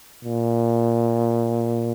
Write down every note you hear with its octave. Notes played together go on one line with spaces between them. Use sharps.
A#2